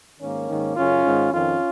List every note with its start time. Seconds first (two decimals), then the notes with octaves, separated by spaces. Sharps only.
0.21 G#2 D#3 A#3 C#4
0.49 G#2 D#3
0.77 F#2 C#3 C#4 F4
1.05 G#2 D#3
1.33 F2 D#3 C#4 F4